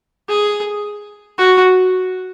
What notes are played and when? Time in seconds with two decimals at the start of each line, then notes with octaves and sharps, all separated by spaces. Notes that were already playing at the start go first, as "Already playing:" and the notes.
0.29 G#4
1.38 F#4